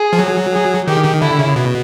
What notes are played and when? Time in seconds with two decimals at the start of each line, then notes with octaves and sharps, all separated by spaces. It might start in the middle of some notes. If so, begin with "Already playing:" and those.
Already playing: G#4
0.13 F3
0.19 F#3
0.52 G#4
0.87 D#3 G4
1.04 D#3
1.21 D3 E4
1.39 C#3
1.56 B2